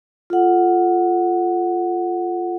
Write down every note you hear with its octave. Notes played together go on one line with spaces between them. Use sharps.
F4 A4 F#5